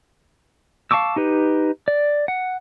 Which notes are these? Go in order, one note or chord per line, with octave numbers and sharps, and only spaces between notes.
F5 A5 C#6 D6 E6
D#4 G4 B4
D5
F#5